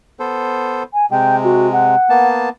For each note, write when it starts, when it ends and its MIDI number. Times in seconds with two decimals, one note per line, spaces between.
0.20 0.83 59
0.20 0.83 69
0.20 0.83 72
0.94 1.06 80
1.11 1.95 48
1.11 1.95 56
1.11 1.36 79
1.44 1.71 66
1.73 2.28 78
2.10 2.49 58
2.10 2.49 59
2.10 2.49 81